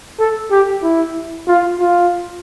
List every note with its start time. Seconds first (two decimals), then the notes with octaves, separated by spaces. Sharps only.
0.19 A4
0.51 G4
0.83 E4
1.47 F4
1.79 F4